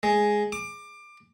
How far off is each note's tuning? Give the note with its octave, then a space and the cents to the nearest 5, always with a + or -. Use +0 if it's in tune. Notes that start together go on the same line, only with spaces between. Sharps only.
G#3 +0
D6 +20